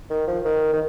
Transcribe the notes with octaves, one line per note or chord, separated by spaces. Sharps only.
D#3
F3
D#3
D#3